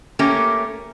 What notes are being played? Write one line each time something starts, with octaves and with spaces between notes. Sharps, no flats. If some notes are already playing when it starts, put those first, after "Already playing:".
A3 A#3 C#4 G4